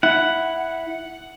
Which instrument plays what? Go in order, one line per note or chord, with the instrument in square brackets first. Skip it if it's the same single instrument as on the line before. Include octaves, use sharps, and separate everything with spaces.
[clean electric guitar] E4 [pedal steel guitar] F#5